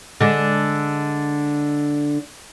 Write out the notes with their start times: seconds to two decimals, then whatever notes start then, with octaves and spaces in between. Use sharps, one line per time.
0.21 D3 G#3 D4